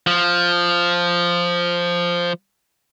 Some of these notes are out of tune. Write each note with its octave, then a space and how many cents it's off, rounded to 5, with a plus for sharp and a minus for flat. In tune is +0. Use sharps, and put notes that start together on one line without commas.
F3 +0